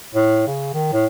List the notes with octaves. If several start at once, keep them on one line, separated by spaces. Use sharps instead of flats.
A2
C#3
D#3
A2